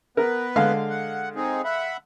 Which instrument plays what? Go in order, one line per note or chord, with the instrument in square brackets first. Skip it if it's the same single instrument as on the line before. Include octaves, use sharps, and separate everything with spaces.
[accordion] B3 B4 [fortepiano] A#4
[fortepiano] D3 G#3 F5
[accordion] F#5
C4 D#4 G#4
E5 F#5 B5